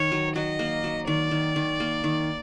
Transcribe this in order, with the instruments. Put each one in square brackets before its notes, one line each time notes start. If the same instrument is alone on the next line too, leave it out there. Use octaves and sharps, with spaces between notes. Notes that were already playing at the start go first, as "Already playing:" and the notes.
Already playing: [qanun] D#3 [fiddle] C#5
[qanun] F#3
[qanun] F#3 [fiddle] D#5
[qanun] A#3
F#3
[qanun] D#3 [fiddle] D5
[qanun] D#3
D#3
A#3
D#3